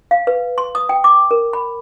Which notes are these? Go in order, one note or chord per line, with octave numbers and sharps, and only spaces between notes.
F5
B4
C6
D#6
G5
D6
A#4
B5